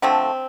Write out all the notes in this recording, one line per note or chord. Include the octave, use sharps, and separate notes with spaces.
D3 F3 A3 C4